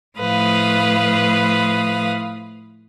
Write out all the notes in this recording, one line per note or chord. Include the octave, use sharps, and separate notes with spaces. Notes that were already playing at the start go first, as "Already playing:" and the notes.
A2 F3 B4 F5 D#6